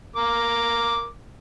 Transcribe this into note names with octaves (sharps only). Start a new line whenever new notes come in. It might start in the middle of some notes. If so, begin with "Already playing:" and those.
A#4 D6